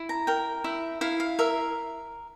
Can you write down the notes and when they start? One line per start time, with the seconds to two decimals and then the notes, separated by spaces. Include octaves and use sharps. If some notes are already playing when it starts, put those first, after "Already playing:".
Already playing: E4
0.09 A#5
0.27 A#4 G5
0.64 E4 E5
1.01 E4 F5
1.20 F5
1.39 A#4 E5